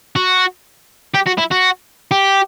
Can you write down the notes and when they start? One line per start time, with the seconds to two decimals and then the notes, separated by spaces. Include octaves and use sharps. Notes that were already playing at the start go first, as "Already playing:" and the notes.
0.16 F#4
1.14 G4
1.26 F#4
1.38 E4
1.51 F#4
2.11 G4